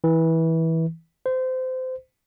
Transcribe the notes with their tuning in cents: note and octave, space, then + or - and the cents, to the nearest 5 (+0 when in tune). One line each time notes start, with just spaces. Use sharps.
E3 -20
C5 -25